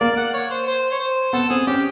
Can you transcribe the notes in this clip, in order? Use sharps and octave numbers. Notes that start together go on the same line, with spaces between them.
A#3 D5
F#5
C#5
C5
C5
C#5
C5
B3 A4
C4 G#4
C#4 G4